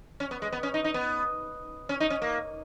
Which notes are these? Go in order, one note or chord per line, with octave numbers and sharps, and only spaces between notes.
C#4
B3
G#3
B3
C#4
D#4
D#4
B3
C#4
D#4
C#4
A#3